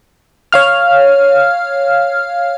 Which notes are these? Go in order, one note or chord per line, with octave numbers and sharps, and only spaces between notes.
C#5 F5 F6